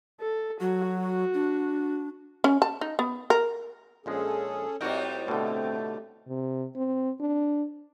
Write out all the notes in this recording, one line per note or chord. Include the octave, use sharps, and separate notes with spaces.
A4
F#3 F#4
F#4
D4
C#4
A5
D#4
B3
A#4
A#1 F3 G#3 C#4 G#4 A4
A2 G3 C4 D#4 F#4 A#4 G5
B2 D3 A3
C3
C4
D4